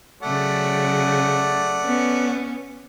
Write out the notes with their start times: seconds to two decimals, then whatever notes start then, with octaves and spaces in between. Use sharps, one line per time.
0.23 C#3 F#3 A3 D5 F#5
1.84 B3 C#4